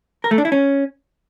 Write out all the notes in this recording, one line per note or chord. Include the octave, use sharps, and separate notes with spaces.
A#4
A3
D4
E4
C#4